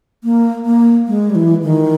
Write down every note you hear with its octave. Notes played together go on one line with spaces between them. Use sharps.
A#3
A#3
G#3
G3
E3
D#3